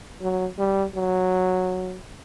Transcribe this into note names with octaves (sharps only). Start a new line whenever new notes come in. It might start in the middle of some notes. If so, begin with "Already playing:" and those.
F#3
G3
F#3